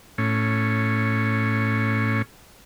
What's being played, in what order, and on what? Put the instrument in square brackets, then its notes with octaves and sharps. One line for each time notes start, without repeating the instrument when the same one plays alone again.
[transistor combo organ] A2 C#4